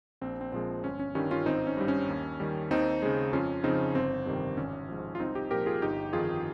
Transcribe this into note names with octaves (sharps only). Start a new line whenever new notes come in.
A#1 C4
C4
A#2 F3 G#3 C4
G1 C#4
C#4
G2 D#3 G3 C#4
C#4 F4
G#1 C4 D#4
C#4
G2 G3
C#4
D#2
D#3 G3
D#2 C4 D#4
C#3 G#3
F2 C#4 F4
C#3 F3 C4 D#4
G1 C4
F2 C3 D#3 G3
G#1 C#4
G#2 F3
F4
C2 C4 D#4
D#4 G4
A#2 F3 G4 A#4
F4 G#4
G1 D#4 G4
F2 D#3 F4 G#4